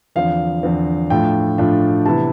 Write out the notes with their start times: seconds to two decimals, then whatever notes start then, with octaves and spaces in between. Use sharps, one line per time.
0.16 E2 D3 F3 C4 F5
0.63 E2 D3 F3 C4
1.10 A2 F3 A3 D4 F4 G5
1.58 A2 F3 A3 D4 F4
2.06 C3 E3 B3 E4 A5